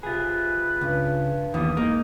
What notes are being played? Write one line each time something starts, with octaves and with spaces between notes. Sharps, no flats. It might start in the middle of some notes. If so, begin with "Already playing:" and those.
C3 F4 G#4 B4
C#2 G2
D#2 B2 E3 G3 D#6
G#3 A#3 D#4